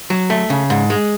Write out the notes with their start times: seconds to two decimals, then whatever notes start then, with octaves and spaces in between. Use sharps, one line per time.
0.10 F#3
0.30 A3
0.50 C#3
0.70 G#2
0.90 G#3